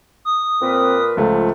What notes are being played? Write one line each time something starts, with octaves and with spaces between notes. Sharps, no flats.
D#6
A#2 C4 A#4 B4
C#2 F3 A3